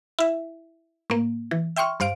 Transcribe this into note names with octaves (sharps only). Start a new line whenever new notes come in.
E4 E5
A2 A#3
E3
E5 G5 C6 C#6 F6
G2 C5 F5 D7